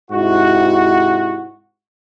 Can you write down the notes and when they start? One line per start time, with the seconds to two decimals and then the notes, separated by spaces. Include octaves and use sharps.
0.11 G#2 C3 E4 F#4